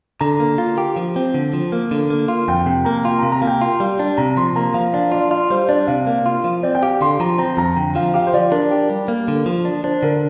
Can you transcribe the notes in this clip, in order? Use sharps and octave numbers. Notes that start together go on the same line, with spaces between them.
D3 A#5
A#3
F4
G4
F3
C4
D3
F3
A#3
D3
A#3
F4
F2 G5
C3 G5
A#3 A#5
F4 G5
C3 A#5
A#5
A#3 F5
G5
F4
G3
D4
C3 A#5
F3 C6
A#3 A#5
F3 F5
D4 F5
F4 D5
F4 D5
G3 C5
D4 D5
C3 F5
A#3
F4
F3
C4 D5
G5
G4 F5
D3 C6
F3 A#5
C4 A#5
F2 A#5
D3 G5
F3 F5
G4 F5
C5
F3 D5
D4 A#4
G4
G3
A#3
D3
F3
D4
D4 C5
D3 A#4